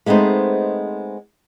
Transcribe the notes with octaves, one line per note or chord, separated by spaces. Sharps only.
G#3 A3 B3 C4 D#4 C5